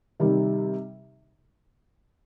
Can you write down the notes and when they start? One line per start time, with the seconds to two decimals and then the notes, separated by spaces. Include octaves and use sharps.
0.20 C3 D#3 G3